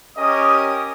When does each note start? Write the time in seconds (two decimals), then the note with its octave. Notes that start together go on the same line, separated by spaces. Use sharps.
0.18 C#4 G4 A#4 D#5 D#6